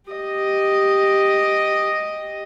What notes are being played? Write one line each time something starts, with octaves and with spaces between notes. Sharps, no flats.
G4 D#5